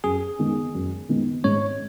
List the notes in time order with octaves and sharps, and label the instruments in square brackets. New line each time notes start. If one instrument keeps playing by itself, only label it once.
[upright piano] F#2 [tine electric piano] G#4
[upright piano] D#3 G#3 B3
F#2
D#3 G#3 B3
[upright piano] G#2 [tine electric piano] C#5